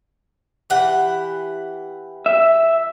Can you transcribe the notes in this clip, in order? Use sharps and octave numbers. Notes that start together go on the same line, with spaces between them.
E3 G4 F#5
E5